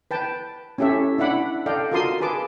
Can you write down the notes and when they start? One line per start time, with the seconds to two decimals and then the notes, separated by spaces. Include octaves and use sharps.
0.11 B4 G5 A5
0.78 C#4 E4 G4 A4 E5
1.18 D4 E4 E5 F#5 B5 D6
1.66 A4 D5 D#5 F5 G5
1.92 F4 F#4 A#4 A5 C6 D#6
2.21 G#4 B4 A5 D6